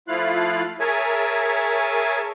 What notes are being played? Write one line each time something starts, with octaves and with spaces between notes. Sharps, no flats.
F3 A3 E4 F4 F5 F#6
G#4 A#4 C#5 E5 G#5 A5